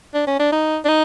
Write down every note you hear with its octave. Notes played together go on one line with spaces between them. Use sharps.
D4
C#4
D4
D#4
D4
D#4